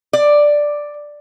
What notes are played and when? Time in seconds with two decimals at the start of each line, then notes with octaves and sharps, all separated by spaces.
0.13 D5